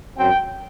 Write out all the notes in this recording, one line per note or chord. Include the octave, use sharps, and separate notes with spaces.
F#2 F#3 C4 G5